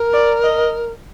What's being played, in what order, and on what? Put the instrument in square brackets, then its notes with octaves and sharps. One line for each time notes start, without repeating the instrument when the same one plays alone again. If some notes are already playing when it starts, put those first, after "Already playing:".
Already playing: [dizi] A#4
[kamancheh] D5
D#5